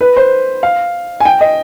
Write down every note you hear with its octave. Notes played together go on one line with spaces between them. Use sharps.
B4
C5
F5
G#5
G5
D#5